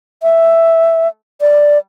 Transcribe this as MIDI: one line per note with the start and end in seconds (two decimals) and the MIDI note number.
0.23 1.08 76
1.41 1.78 74